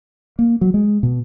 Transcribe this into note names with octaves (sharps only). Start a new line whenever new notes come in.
A#3
F#3
G#3
B2